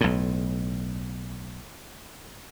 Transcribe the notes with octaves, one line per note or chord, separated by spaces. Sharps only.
B1 A2